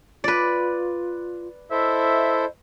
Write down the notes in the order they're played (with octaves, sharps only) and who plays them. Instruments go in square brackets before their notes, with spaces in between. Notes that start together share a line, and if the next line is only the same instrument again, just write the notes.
[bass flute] F4 [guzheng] B4 D5
[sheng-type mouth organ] E4 A4 C5 [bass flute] D#5 [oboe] E5